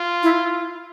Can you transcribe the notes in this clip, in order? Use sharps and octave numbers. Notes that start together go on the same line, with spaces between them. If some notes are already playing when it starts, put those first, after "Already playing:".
Already playing: F4
E4